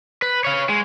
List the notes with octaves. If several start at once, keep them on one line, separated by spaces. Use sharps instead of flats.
B4
C#5 F5
G#3